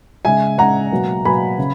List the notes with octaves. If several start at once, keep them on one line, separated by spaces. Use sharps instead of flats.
C#3 G#3 E5 G#5
C#3 G#3 F#5 A#5
B2 F#3 A#3
B2 F#3 A#3 G#5 B5
C#3